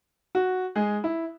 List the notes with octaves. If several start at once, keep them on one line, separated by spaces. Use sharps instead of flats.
F#4
G#3 G#4
E4